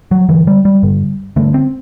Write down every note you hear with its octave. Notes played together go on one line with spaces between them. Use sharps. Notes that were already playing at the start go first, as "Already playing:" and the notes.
F#3
G2 D3 E3
G3
G3
G2 D3
G2 D3 A3
C4